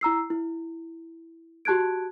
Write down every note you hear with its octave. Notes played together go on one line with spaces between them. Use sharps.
E4 A#5 E6 C7
E4
F#4 G4 A5 F#6 G#6 D7